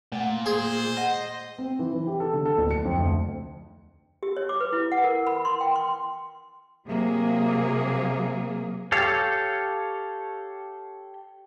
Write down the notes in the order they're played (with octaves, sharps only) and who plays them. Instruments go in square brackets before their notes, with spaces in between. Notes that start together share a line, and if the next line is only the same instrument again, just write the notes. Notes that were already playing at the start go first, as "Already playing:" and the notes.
[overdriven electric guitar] A#2 [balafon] A3 F#5
[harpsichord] G#4 [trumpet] C5
[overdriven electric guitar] D#5 [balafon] F#5
[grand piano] C4
E3
E3
G4
A4
D3
A4
D1
C#7
F2
D2
[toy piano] G4
C#5
D6
B4
E4
F#5
A#4
B5
C6
G5
C6
[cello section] C3 F#3 A#3 G#4
[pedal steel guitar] G4 A4 C#5 F5